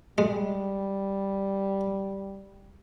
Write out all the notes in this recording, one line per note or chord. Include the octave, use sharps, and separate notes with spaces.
G3 G#3